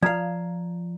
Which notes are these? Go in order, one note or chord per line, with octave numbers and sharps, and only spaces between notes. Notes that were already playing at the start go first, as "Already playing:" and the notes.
F3 D5 F5 A#5